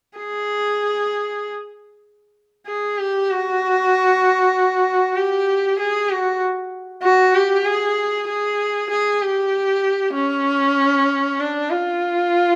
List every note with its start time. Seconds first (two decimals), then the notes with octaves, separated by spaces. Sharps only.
0.18 G#4
2.67 G#4
2.98 G4
3.30 F#4
5.15 G4
5.79 G#4
6.10 F#4
7.03 F#4
7.35 G4
7.65 G#4
8.27 G#4
8.90 G#4
9.21 G4
10.14 C#4
11.39 D4
11.70 F4